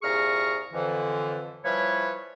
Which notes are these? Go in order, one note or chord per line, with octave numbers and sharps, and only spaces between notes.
C2 A#2 G#4 A#5 C#6 F6
F2 D3 E3
E3 F3 G3 B4 C#5